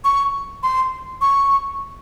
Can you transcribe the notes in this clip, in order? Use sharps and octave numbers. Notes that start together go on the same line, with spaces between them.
C#6
C6
C#6